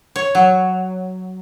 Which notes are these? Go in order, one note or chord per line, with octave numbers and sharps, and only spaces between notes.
C#5
F#3